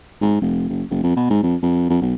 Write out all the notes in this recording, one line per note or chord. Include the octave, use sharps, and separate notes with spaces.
G#2
F1
F#1
F#1
F2
B2
G#2
F2
F2
F2
B1